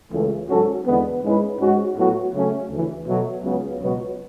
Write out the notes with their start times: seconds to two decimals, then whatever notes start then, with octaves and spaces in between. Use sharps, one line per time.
0.12 C#2 C#3 E3 A3
0.49 G#2 F#3 C#4 F#4 A4
0.85 E2 D3 G#3 B3
1.23 G#2 G#3 C#4 E4 B4
1.59 G#2 G#3 C#4 F#4
1.96 A2 F#3 B3 F#4
2.33 C#3 F#3 A3 C#4
2.70 D2 C#3 E3
3.06 B2 F#3 A3
3.43 C#2 C#3 F#3 B3
3.80 C#2 B2 F#3 B3 F#4